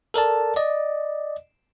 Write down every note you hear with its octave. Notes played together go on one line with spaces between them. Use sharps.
A4 A#4 D5 A5
D5 D#5